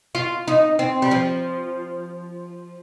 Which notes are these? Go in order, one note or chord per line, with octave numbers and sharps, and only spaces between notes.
F4
D#4
C4
G3
F3